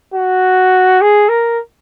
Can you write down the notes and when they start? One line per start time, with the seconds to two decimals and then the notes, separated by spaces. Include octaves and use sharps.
0.14 F#4
1.01 G#4
1.29 A#4